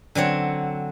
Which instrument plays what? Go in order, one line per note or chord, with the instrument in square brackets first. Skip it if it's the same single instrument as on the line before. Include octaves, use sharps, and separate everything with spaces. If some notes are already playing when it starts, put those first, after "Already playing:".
[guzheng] D3 F#3 C4 C#5